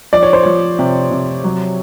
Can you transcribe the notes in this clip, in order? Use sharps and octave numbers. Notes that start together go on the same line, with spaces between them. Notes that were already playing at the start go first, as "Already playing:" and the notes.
F3 D5
C#5
C5
F3 C#5
C3
C3
F#3